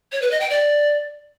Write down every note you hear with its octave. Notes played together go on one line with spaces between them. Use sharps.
C#5
B4
D#5
G5
D5